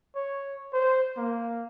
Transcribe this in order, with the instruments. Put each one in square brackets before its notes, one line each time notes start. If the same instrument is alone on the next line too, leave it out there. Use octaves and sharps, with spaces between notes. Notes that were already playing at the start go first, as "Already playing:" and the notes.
[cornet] C#5
C5
A#3